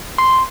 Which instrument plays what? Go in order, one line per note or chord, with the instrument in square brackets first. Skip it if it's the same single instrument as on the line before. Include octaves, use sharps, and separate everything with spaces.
[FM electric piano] C6